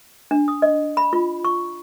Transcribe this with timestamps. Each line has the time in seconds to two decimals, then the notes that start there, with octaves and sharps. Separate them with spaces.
0.31 D4
0.48 D#6
0.62 D#5
0.97 B5
1.13 F4
1.45 C#6